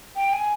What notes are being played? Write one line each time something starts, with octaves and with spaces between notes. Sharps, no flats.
G5
G#5